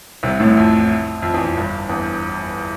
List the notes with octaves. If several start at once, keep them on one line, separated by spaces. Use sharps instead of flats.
C2 C3
A1 A2
F2
F2
E2
F2
G1 G2
E2